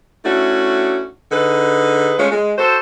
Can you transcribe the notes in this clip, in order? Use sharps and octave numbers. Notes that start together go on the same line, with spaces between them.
A3 C#4 D4 E4 F#4
D3 D#4 G#4 B4
G#3 A3 C#4 F4 C#5
G#3
F#4 A4 C5